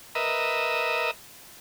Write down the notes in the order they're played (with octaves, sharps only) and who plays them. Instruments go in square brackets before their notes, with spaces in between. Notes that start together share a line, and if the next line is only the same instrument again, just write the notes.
[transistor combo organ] A#4 B4 D#5 E5